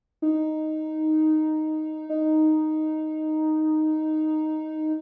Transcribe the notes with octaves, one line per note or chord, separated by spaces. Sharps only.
D#4
D#4